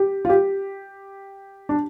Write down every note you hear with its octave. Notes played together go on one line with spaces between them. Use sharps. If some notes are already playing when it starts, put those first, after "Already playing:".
Already playing: G4
F4
G4
D4